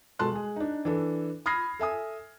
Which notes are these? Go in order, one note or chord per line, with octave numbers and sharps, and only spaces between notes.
B2 G#3 A4 A5 C6 F#6
G#3 G#4
D4 D#4
E3 D4 A4
B5 D#6 F6 G#6 A#6 C7
A4 E5 G#5 D#6